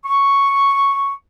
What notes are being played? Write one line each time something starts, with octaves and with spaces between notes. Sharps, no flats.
C#6